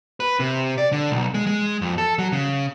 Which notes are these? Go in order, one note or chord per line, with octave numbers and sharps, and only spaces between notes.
B4
C3
D5
D3
B1
G#3
G#3
F2
A4
F#3
C#3